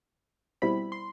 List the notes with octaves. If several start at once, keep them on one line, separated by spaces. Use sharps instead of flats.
B2 G3 C4 E4 B5
C6